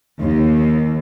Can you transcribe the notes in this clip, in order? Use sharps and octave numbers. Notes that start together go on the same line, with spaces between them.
D#2